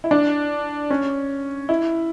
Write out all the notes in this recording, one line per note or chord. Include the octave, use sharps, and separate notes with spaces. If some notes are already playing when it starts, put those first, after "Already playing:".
E4
D4
C#4
E4